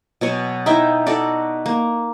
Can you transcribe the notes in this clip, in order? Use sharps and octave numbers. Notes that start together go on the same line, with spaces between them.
B2 F#3 C#5 G#5
D#4 E4 E5 G5
D#4 F#4 A4 D5
A#3